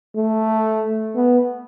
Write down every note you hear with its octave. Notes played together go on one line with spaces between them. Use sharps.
A3
B3